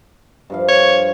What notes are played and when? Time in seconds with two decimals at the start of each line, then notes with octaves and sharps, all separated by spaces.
0.50 G2 F3 F5
0.68 C#5